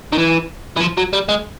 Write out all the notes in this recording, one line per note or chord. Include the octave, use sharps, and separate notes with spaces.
D#3
E3
E3
F3
F#3
G3
G#3